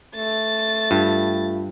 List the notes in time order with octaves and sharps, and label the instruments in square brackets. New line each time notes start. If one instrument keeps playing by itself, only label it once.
[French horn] A3 [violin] A6
[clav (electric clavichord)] G2 [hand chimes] F4